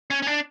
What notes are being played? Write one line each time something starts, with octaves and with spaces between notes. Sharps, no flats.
C#4
C#4
D4